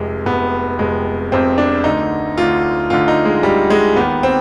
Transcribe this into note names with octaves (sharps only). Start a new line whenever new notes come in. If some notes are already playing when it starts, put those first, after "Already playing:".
Already playing: F1 F2 C3 G#3
F1 F2 C3 B3
F1 F2 C3 G#3
F1 F2 C3 C4
D4
D2 D3 D#4
D2 D3 F4
D2 D3 F4
D#4
G#3
D2 D3 G3
G#3
D#2 D#3 B3
C4